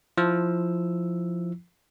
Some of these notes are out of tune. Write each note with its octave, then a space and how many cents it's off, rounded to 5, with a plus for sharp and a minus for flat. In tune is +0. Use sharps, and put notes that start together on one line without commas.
F3 +0 E4 +0 E6 +0